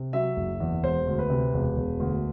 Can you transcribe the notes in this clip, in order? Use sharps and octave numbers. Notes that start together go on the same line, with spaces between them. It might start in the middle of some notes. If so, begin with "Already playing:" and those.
Already playing: C3
F#3 E5
F#1
E2
E1 C5
D2
B4
C3
E1
E1
D2